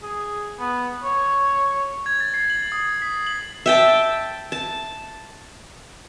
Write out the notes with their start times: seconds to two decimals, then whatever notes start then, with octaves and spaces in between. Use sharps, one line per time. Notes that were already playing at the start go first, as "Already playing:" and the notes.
0.03 G#4
0.59 B3
1.04 C#5
2.06 G#6
2.20 A6
2.34 C7
2.50 F#7
2.72 D#6
3.02 B6
3.27 F#7
3.66 E5 G5 A5
4.52 A5